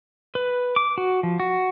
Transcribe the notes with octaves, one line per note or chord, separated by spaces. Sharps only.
B4
D6
F#4
F3
F#4